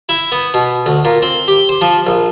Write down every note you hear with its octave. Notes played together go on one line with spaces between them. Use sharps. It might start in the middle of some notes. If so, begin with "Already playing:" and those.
E4
B3
B2
D2
A#2
C4
G4
C5
F3
A#1